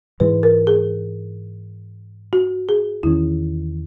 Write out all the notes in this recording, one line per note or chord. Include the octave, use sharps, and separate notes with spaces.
G#2 E3 G#3 B4
A#4
G#4
F#4
G#4
E2 D#3 A#3 C#4 E4